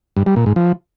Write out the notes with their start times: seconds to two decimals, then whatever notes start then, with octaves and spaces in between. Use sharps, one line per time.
0.17 G2
0.26 G3
0.36 A#2
0.46 G#2
0.56 F3